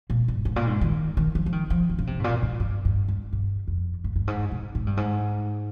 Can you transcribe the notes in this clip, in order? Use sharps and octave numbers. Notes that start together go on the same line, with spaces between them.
A#2
G2
G#2
A#2
G#2
D#3
D#3
F3
F3
D#3
F3
D#3
C#3
C3
G#2
A#2
G#2
G2
G2
G2
G2
F2
G2
G2
G#2
C3
G#2
G2
G#2